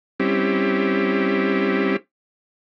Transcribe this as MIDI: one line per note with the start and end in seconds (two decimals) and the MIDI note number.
0.20 1.96 55
0.20 1.96 60
0.20 1.96 61
0.20 1.96 64
0.20 1.96 67